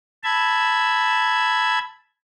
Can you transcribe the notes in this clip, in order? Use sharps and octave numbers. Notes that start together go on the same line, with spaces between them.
A5 B5 E6 G#6